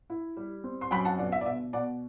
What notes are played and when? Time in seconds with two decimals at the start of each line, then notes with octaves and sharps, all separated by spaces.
0.10 E4
0.37 G3
0.64 C4
0.81 C6
0.91 F#2 G5 B5
1.05 F#5 A5
1.18 G1 D5 F#5
1.32 E5
1.41 D5
1.45 B2 E5
1.73 B2 D5 F#5